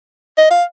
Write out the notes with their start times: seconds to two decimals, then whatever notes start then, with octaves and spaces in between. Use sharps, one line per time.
0.38 D#5
0.51 F5